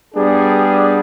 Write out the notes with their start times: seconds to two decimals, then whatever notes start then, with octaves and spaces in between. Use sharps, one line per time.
0.15 G3 B3 D4 G#4